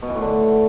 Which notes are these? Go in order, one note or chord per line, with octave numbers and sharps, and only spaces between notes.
B2
E3
A2
D3